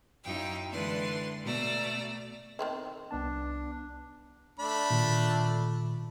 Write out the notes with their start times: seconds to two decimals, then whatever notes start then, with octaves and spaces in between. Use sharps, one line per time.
0.23 F#2 D#4 E4 F5 G5
0.71 D3 E3 G#3 D4 B4 C6
1.43 B2 A3 D5 A#5 E6
2.59 D#3 C4 E4
3.11 C2 B3 D4 A5
4.59 A3 D4 B5
4.90 A#2 D#3 F4